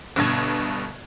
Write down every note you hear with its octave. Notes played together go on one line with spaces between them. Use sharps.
G1 G2 B2 G#6